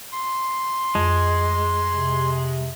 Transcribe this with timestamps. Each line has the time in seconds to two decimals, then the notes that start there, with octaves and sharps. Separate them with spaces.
0.12 C6
0.95 F2 G#3
1.90 C3